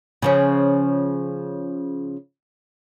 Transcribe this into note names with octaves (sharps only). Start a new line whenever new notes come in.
C#3 F3 C#4